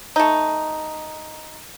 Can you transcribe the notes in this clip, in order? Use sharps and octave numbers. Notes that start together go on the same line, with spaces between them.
A3 D#4